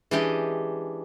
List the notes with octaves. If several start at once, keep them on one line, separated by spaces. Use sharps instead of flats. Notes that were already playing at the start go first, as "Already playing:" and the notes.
E3 G#3 C#4 D4 G4 D#5